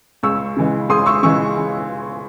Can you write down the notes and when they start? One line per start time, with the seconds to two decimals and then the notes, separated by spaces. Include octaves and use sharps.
0.23 C#2 C#6 E6
0.57 C#3 E3 G#3
0.89 C#2 C6 D#6
1.06 C#6 E6
1.23 C#3 E3 G#3 C#6 E6